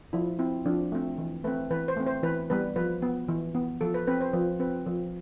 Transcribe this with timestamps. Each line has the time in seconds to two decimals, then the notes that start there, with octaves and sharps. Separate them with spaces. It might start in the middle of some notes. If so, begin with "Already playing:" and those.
0.13 F3 E4
0.39 C4 E4
0.66 F3 D4
0.92 A3 C4
1.18 E3
1.44 A3 C4 B4
1.71 E3 B4
1.88 C5
1.97 A3 C4
2.06 C5
2.23 E3 B4
2.50 G3 B3 B4
2.76 F3 B4
3.02 B3
3.28 E3
3.55 B3
3.81 F3 A4
3.94 B4
4.07 C4 B4
4.21 C5
4.34 F3 B4
4.60 C4 B4
4.86 F3